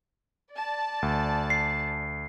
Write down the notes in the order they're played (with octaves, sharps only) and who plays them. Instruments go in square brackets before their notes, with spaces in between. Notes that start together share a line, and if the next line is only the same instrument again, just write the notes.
[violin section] D5 A5
[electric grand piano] D2
[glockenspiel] C7